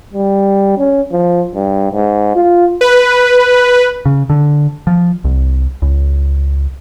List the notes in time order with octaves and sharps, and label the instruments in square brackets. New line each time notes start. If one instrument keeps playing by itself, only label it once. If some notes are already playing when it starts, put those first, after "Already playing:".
[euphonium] G3
C#4
F3
G2
G#2
F4
[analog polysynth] B4
[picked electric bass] C#3
D3
F3
C2
C#2